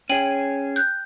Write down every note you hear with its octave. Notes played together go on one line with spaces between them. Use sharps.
C#4 G#4 G5 D#7 F#7
F#6 G6